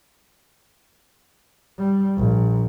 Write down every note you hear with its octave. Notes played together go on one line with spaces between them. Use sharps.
G3
A#1